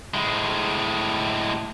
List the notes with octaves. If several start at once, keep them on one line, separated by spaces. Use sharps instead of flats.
A2 G#3